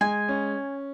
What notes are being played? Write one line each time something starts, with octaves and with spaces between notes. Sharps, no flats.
G#3 G#5
C#4